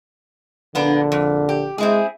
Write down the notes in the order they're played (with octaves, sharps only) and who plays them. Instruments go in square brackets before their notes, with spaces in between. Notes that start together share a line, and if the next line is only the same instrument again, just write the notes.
[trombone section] A#1 D3 [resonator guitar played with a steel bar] A#3 B3 D4
[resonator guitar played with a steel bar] F2
G4
[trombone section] G#3 [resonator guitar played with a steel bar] C4 E4 G#4